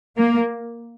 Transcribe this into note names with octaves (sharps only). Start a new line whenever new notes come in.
A#3